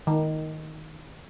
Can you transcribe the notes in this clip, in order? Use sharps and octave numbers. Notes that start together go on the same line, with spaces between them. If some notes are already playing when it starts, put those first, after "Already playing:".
D#3